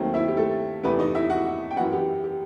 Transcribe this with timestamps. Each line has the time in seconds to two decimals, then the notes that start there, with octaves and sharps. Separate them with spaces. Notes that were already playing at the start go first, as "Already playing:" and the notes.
Already playing: D#2 D#3 F#3 A3 C4
0.14 E4 E5
0.28 G4
0.37 A3 A4
0.83 E2 C3 E3 A3 B3 B4
0.99 D#4 D#5
1.15 E4 E5
1.30 F#4 F#5
1.71 G5
1.76 F#2 E3 B3 F#4 F#5
1.92 G4
2.24 G4